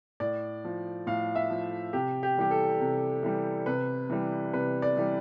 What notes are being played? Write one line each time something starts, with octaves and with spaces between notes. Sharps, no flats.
A2 D5
F3
A2 F5
E5
F3
C3 G4
G4
E3 G3 G4
A4
C3
E3 G3
C3 B4
E3 G3
C3 B4
D5
E3 G3